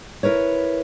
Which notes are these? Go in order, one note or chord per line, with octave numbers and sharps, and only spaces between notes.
E4 A#4 B4 C#5